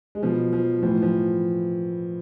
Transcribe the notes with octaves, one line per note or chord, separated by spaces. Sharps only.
G#3
B2 F3
F3
A2 E3 F3
F3